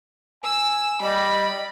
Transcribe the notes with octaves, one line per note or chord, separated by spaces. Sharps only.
G#5 E6
G3 D5 D#5 B5